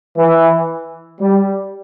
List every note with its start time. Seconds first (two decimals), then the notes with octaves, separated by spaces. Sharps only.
0.17 E3
1.21 G3